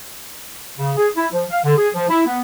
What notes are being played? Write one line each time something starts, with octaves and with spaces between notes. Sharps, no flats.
C#3
G#4
E4
F3
F5
D3
G#4
F3
E4
B3